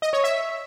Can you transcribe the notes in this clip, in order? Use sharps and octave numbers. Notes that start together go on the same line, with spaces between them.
D#5
C#5
E5